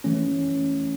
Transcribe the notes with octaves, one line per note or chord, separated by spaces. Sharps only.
E3 A3 C#4